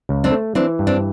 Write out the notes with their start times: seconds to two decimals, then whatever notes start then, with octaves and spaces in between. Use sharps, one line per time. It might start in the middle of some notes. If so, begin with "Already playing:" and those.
0.09 C#2
0.24 C4 D4
0.32 A3
0.55 E3 C4 D4
0.79 G2
0.87 C4 D4